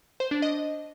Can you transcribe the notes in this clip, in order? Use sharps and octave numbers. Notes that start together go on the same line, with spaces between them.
C5
D4
D#5